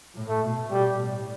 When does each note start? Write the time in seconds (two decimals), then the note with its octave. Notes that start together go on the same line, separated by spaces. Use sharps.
0.14 A2
0.28 A3
0.42 B2
0.71 B2 G3
1.00 A2